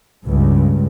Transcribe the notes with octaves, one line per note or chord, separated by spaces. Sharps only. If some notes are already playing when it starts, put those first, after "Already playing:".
C#2 G2